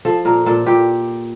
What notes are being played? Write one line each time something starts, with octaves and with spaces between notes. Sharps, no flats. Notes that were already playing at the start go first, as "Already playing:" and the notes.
F3 A4
A#2 A#4
A#2 A4
A#2 G4